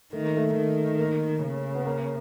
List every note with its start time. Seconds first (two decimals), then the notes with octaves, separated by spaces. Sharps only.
0.12 D#3 A3
0.24 A#3
0.37 A3
0.56 D#3
0.99 A#3
1.43 C#3
1.75 B3
1.86 A#3